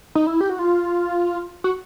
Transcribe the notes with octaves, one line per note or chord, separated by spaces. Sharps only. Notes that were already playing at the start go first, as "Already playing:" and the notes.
D#4
E4
G4
F#4
F4
F#4